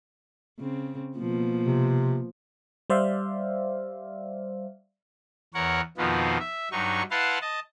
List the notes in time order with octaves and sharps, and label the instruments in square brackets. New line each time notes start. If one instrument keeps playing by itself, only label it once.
[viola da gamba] C#3 C4
B2 F3 A#3
[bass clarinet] C3
[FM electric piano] G3 C5 D5 E5 F5
[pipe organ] E2 A#4 C#5 F#5
F2 B2 D#3 F3 B3 F4
E5
G2 F#3 D#4 C#6
E4 B4 F5 F#5 A5 C6
D#5 A5